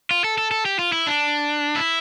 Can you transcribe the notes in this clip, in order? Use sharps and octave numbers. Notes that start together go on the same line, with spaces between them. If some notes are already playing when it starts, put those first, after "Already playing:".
F4
A4
A4
A4
G4
F4
E4
D4
E4